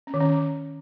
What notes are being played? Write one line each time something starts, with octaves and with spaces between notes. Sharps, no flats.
C#4
D#3
C#4